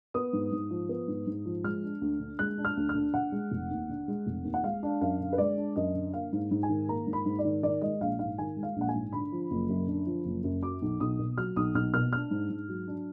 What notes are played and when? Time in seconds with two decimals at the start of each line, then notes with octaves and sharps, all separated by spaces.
0.14 B3 D#6
0.33 G#2
0.52 G#2
0.70 F3
0.89 B3
1.08 G#2
1.27 G#2
1.45 F3
1.64 G#3 F6
1.83 D4
2.01 D2
2.20 D3
2.39 G#3 F#6
2.58 D4
2.65 F6
2.77 D2
2.89 F6
2.95 D3
3.14 D3 F#5
3.32 G#3
3.51 F1
3.71 D#2
3.89 D3
4.08 G#3
4.27 F1
4.45 D#2
4.54 F#5
4.64 G#3 F5
4.83 D4
5.01 F#2 F5
5.20 D3
5.33 B4
5.38 G#3 D5
5.57 D4
5.76 F#2 D#5
5.95 D3
6.13 A#3 F5
6.33 G#2
6.51 G#2
6.63 G#5
6.69 D#3
6.88 A#3 A#5
7.07 G#2
7.13 B5
7.26 G#2
7.39 D5
7.45 D#3
7.63 D#3 D5
7.81 G#3 D#5
8.01 A#1 F5
8.19 G#2 F5
8.38 D#3 G#5
8.57 G#3
8.63 F5
8.76 A#1 F#5
8.88 G#5
8.95 G#2
9.13 D3 B5
9.32 F3
9.51 F#1
9.69 F#2
9.88 D3
10.07 F3
10.25 F#1
10.44 F#2
10.63 F#3 D6
10.82 B1
11.00 B1 D#6
11.19 B2
11.37 F#3 F6
11.56 B1 D#6
11.75 B1 F6
11.94 B2 F6
12.13 D4 F6
12.31 G#2
12.50 G#2
12.69 F#3
12.87 D4